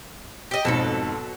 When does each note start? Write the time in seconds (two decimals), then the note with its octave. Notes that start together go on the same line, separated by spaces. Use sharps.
0.51 G4 D#5
0.65 F2 G#2 B2 F#3 A4